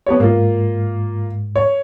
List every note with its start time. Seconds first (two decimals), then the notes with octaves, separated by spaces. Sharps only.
0.06 B3 G4 C#5
0.20 G#2 A#3 F4
1.56 C#5